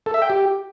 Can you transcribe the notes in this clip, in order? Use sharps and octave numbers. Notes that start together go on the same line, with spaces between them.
A4
E5
G5
G4